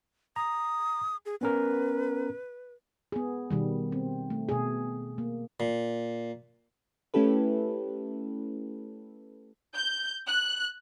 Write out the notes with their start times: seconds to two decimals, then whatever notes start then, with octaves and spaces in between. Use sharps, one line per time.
0.36 A#5 D#6
1.26 G#4
1.41 B3 C#4 A#4 B4
3.12 B3 G#4
3.51 B2 D#3 G3
3.92 C4
4.30 A3
4.49 B2 G#4
5.18 A#3
5.60 A#2
7.14 A3 C#4 E4 G4 A4 B4
9.75 G6
10.28 F#6